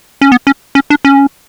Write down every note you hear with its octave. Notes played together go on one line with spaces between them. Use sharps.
C#4
B3
C#4
C#4
D4
C#4